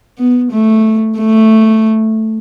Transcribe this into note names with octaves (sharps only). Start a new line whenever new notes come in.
B3
A3
A3